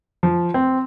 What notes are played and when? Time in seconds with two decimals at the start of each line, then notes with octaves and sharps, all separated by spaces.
0.23 F3
0.54 C4